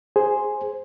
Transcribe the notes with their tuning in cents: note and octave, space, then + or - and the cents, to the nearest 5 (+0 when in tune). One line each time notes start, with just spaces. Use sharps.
G#4 +0 C5 +0